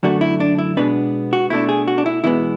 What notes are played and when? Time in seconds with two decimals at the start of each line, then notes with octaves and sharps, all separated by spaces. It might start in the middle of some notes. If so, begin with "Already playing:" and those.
0.03 F#2 D3 A3 D4 F#4
0.21 E4
0.40 D4
0.58 E4
0.77 B2 G#3 B3 D4 B4
1.33 F#4
1.50 B2 A3 D4 E4
1.69 G#4
1.88 F#4
1.98 D4
2.06 E4
2.24 E2 B2 G#3 B3 E4